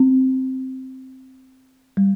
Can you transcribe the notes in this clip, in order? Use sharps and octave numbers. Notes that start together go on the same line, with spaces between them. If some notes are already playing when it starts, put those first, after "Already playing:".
Already playing: C4
G3